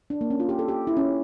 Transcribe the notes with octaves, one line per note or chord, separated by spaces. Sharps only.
D4
A#3
C#4
F4
G4
A4
G4
E4
C#4